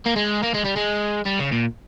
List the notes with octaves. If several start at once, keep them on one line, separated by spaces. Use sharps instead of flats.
A#3
G#3
A#3
G#3
G3
G#3
G3
C#3
A#2